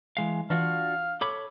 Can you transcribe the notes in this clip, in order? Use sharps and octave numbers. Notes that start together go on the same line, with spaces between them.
E3 G#3 F5
E3 D4 F4 F#4 F5
A4 C#5 B5 D6